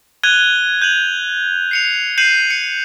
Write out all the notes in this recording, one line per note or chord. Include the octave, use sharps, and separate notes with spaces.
F#6 G#6 D#7 F7 G7
G6 D#7 F7 F#7
C7 C#7 F7
G6 C7 C#7 D#7 E7 F#7
C#7